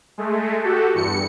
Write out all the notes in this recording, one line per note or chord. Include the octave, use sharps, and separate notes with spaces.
G#3 A3
F#4 G4 A4
E2 G2 C#7